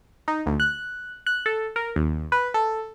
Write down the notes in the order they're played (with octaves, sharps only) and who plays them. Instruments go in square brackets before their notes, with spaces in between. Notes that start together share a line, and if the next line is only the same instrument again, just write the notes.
[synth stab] D#4
D2
F#6
F#6
A4
A#4
D#2
B4
A4